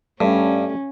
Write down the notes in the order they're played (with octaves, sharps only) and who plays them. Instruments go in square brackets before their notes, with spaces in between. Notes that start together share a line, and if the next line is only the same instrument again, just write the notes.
[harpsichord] G2 [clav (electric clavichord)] G3 A3 [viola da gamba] C#4